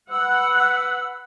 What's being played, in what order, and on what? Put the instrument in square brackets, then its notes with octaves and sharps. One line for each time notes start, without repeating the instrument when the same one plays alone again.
[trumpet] B4 [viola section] F#5 [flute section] E6